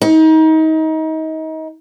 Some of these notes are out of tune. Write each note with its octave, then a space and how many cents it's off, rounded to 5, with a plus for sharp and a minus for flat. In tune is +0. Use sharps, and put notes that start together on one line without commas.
D#4 +30